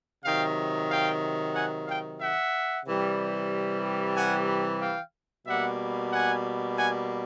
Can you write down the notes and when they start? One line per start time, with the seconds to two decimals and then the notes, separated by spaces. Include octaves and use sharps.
0.24 C3 D#3 F#3 F5 G5
0.90 F5 G5
1.54 F#5 G#5
1.87 F5 G5
2.20 E5 F#5
2.85 C3 E3 G3
4.16 F#5 G#5
4.81 F5 G5
5.46 B2 G3 A#3 E5 F#5
6.12 F#5 G#5
6.77 F#5 G#5